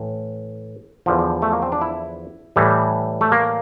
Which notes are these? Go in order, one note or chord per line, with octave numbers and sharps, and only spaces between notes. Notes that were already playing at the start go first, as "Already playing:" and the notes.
Already playing: A2 E3
E2 D3 F3
A3
A#3
C4
D4
E4
A2 E3 G3
A3
A#3